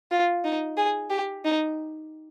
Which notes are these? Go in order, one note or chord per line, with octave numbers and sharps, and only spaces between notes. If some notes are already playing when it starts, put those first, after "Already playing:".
F4
D#4
G#4
G4
D#4